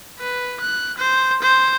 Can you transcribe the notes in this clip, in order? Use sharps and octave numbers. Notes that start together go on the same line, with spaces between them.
B4
F#6
C5
C5